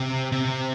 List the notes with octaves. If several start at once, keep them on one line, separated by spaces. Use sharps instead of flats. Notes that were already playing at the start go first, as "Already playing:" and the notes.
Already playing: C3
C3